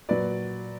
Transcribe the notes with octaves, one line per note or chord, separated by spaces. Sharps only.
A#2 F#3 B4 D5